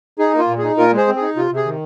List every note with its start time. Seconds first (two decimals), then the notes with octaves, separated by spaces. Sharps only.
0.19 D#4 G#4
0.33 A#3
0.39 F4
0.48 A#2
0.58 G#4
0.63 D#4
0.77 A#2 F4 A#4
0.93 G#3 G#4 C5
1.07 C4
1.16 G#4
1.22 D#4
1.36 C3 F4
1.51 C3
1.56 G#4
1.65 D#3